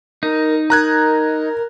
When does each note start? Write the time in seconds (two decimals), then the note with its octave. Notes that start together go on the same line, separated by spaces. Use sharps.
0.23 D#4 A#4
0.70 A#4 A#5 F#6 G#6